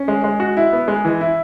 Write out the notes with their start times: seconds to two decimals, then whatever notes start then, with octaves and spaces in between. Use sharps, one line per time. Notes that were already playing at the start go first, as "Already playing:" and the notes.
Already playing: C#4
0.08 G#3
0.24 G#3
0.40 F#4
0.57 E4
0.72 B3
0.88 G#3
1.05 E3
1.21 E4